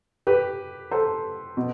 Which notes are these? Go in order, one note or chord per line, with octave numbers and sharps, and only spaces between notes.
G4 B4
A4 C5
B2